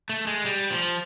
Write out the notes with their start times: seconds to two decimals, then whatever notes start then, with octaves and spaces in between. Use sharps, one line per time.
0.09 A3
0.27 G#3
0.45 G3
0.70 F3